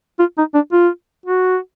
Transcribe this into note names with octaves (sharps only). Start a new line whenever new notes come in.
F4
D#4
D4
F4
F#4